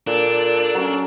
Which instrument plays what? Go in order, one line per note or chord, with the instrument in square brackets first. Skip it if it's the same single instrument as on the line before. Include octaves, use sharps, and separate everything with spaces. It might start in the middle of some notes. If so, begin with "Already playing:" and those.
[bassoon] A#2 [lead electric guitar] D4 [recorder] A4
[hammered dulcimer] F#3 C#4